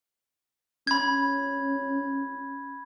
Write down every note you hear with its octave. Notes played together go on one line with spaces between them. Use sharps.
C#4 B5 G#6